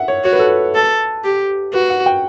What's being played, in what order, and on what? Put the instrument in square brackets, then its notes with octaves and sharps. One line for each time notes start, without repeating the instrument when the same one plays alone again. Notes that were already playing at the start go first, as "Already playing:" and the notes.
Already playing: [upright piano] E5 F#5
C#5
[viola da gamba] F#4 [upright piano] C#5
[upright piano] B4
A4
B4
[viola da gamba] A4
G4
[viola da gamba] F#4 [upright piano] B4
[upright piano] F#5
G5